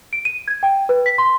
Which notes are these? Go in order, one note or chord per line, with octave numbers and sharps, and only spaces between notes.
D7
D#7
G#6
G5
B4
B6
C6